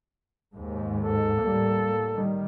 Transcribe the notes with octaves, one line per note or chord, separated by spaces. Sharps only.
D#2 G#2
A4
A2 G3 A#3
D#3 G3